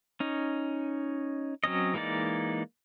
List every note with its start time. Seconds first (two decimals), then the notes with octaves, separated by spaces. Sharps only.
0.20 C#4 D#4
1.64 F#3 C4 C#4 D#5
1.94 E3 G#3 A#3 D#4 D5